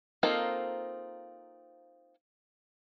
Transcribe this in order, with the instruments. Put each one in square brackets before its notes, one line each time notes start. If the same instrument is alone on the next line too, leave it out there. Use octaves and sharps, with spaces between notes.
[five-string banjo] A#3 C4 D#4 F4 A4